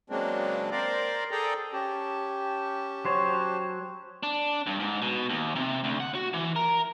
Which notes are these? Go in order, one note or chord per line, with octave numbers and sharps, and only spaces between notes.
C#3 F#3 G#3 A#3 C4 D4
A#4 C5 D5
G#4 A4 D5 G5 A#5
C#4 G4 A5
F#3 C5 C#5
D4
G2
G#2
B2
D#2
C3
D2
F#5
F#4
E3
A#4